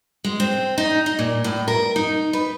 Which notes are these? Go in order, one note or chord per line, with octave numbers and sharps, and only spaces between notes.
G#3
C4
D#4
D#5
A#2
A2
A#4
D#4
B4